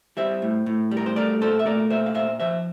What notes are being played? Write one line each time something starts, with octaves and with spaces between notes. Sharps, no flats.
G3 C5 E5
A2
A2
G3
A#4
C5
A3 A#4 D5
A#2 A4 C5
E5
A3 A#4 D5
A#2 C5 E5
F5
A#2 C5 E5
F3 C5 E5